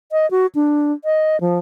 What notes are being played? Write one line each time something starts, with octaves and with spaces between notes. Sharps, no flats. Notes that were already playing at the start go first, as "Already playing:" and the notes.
D#5
F#4
D4
D#5
F3